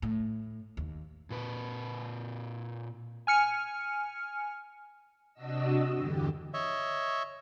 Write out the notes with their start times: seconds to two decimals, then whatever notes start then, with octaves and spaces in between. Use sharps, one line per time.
0.02 A2
0.77 D#2
1.30 A#2 B4
3.27 G#5 F6 C#7
5.33 C3 D4 F#4 D#5 E6
5.94 E2 G2 D3 G4
6.54 C#5 D#5 E5